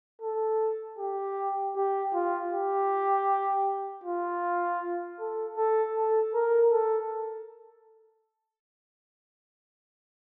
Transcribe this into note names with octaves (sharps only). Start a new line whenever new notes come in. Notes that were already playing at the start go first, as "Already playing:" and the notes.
A4
G4
G4
F4
G4
F4
A4
A4
A4
A#4
A4